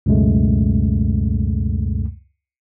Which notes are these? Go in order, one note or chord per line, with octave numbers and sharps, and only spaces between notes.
C#2 F#2 B2 G#3 A3